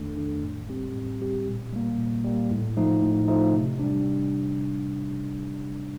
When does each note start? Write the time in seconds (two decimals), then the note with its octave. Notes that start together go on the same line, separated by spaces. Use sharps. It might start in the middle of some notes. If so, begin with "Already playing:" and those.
Already playing: F2 D#3 A3 D4 A4
0.17 D#3 A3 D4 A4
0.43 A2
0.69 G3 C4 G4
0.95 A2
1.20 G3 C4 G4
1.47 A#2
1.72 G3 A#3
1.98 A#2
2.24 G3 A#3
2.51 A2
2.77 F3 A3 D#4
3.02 A2
3.28 F3 A3 D#4
3.53 C3
3.79 G3 D4
4.05 C3